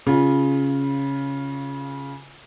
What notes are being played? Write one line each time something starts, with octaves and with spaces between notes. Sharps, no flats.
C#3 F4